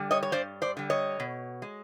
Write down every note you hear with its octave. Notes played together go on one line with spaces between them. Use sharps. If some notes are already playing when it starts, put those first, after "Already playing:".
Already playing: D3 G3
C#5 D#5
C#5
G2 C5 D5
C5 D5
D3 G3
C#5 D#5
B2
G#3